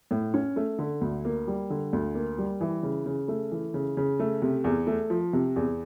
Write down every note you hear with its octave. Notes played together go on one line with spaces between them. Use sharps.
A2
C#4
A3
D3
D2
A#3
G3
D3
D2
A#3
G3
E3
C#3
C#3
A3
E3
C#3
C#3
A3
C3
E2
A3
F3
C3
E2